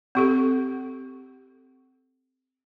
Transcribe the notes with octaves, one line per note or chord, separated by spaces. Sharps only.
C4 G4 A4